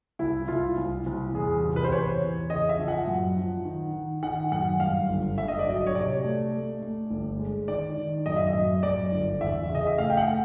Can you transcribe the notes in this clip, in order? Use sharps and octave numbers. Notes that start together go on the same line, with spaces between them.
C2 E4
C2 F4
C2
C2
E2 G#4
C3
B4
C5
E2 C#5
E2
C#3 D#5
E5
F3
F#5
F#2
F3
D#3
D#3
D#3 F#5
F#2 F#5
G2 F5
G1
G1 E5
D#5
D5
F#3 D#5
C#5
C3 D5
A3
A3
A3
G1
G#3
D#3 D5
D#3
F#2 D#5
E5
D#5
F#2
F#2 D5
G1
E2 E5
C#3
D#5
E5
A3 F5
G5
F#5
A3